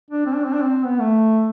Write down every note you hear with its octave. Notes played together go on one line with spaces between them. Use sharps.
D4
C4
D4
C4
D4
C4
B3
A3